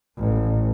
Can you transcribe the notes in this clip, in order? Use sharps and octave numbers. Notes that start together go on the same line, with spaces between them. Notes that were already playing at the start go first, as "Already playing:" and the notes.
A1